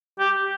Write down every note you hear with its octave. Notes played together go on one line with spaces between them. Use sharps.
G4